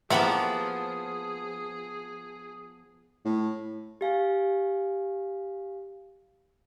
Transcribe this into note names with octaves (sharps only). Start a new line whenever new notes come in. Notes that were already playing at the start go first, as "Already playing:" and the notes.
F3 A#3 B3 E4 G4 G#4 F#5 B5
A2
G4 F5 G#5